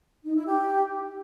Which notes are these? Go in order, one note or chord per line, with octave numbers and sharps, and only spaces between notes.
D#4
E4
G4